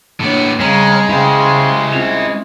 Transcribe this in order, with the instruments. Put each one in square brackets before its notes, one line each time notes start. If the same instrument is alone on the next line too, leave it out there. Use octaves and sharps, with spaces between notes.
[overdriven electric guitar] A2 B3 [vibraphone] A#3 D4 C#5
[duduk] C#3 [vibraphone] G3 C4 A#5 [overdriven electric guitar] G#3 [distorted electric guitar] C#4
[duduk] C#3 [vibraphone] C#4 G5 [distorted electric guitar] E4 C5
[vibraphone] C4 C#4 F4